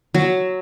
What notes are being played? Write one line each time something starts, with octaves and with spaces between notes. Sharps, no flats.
F#3